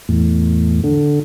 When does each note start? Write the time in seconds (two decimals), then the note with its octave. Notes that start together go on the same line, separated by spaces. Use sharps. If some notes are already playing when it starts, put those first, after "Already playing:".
0.09 E2 A2
0.84 D3